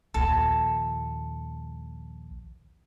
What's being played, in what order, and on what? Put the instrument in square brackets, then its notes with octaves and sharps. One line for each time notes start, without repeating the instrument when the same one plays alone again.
[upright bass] A#1 D#2 [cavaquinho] A4